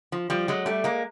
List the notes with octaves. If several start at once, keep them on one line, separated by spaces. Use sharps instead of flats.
F3
F3 G3
F#3 G#3
G3 A3
G#3 A#3